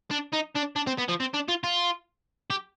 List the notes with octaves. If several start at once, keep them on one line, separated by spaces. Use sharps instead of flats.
D4
D#4
D4
D4
C4
B3
F3
C4
D4
F4
F4
G4